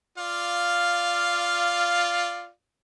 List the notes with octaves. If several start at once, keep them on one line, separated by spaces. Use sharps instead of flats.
F4 D5 F5